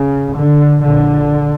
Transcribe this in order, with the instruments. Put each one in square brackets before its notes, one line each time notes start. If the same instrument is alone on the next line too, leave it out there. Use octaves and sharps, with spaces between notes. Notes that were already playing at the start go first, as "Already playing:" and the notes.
Already playing: [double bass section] C#3
D3
A#1 A#2 D3